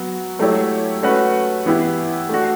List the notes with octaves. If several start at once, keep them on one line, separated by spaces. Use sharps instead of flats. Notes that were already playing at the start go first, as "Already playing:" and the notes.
Already playing: F#3 B3 F#4
F#3 A3 E4 G4 C#5
A3 C#4 F#4 B4
E3 B3 E4 G4
A3 D4 F#4